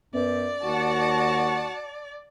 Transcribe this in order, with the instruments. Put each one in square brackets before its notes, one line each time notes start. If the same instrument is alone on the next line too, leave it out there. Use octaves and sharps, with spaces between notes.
[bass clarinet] F#2 [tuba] B3 [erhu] D5
[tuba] D#2 [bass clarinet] F#4 [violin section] F#5 A5